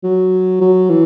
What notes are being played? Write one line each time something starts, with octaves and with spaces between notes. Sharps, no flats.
F#3
F#3
E3